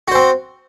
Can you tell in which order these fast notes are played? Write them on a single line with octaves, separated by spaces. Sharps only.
F#4 C5 C4